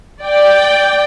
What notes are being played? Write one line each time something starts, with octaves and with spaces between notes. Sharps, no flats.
D5 G5